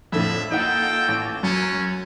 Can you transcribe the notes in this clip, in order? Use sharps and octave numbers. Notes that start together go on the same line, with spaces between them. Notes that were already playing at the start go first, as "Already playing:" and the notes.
F2 A2 D3 F3 E5
A#3 D#4 F4 A4 F#5 G5
A1
F#2 F#3 C#4